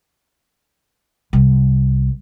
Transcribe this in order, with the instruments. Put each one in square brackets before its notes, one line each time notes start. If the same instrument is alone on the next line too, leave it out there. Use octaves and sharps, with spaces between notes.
[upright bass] C2